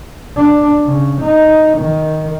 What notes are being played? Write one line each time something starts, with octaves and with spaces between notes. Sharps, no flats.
D4
C#3
D#4
D#3